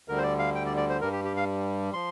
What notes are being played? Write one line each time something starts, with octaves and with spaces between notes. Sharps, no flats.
D2 D3 G3 A#4
C5
D5
F5
G5
D5
D5
C5
G2 G3 A#4
G4
G4
F5
F3 C6